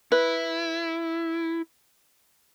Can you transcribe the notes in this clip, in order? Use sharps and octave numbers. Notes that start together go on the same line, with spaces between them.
E4 B4